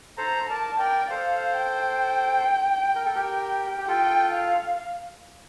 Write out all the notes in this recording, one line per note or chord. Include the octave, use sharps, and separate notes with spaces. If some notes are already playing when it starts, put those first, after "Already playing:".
A4 C5 A#5
A#4 D5 A5
A#4 D5 G5
D5
A4 C5 F5
G5
A#4
A4
G4 A#4
G4
F4 A4 G5
F5